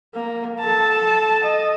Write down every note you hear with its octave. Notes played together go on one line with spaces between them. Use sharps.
A#3
A4 A5
D#5